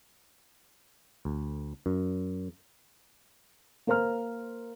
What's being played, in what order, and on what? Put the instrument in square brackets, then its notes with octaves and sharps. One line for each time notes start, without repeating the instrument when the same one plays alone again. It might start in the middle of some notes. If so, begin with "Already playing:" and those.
[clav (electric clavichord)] D2
F#2
[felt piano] A#3 A#4 C5 A#5 F6